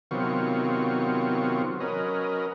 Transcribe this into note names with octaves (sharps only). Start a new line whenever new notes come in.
C3 D#3 F#3 B3 F4 C#6
F#3 C#4 A#4 B4 D#5